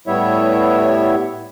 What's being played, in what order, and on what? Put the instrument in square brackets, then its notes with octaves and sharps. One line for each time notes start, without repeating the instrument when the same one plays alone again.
[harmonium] A2 G3 B3 E4 C#5 E5